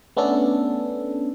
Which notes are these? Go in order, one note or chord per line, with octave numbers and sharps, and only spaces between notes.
A3 B3 C#4 D4 A4